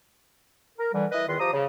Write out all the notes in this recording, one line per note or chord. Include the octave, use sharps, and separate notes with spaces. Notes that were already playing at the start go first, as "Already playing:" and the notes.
A#4
D3 E3 G3
E4 B4 D#5
E2 D#3 F4 B4 C6
F3 G4 A#5 D#6
C#3